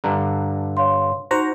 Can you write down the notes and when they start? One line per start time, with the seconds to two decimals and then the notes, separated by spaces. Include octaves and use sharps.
0.04 G2 D3 A#5
0.77 C#5 F5 C6
1.31 D#4 F#4 C5 A#5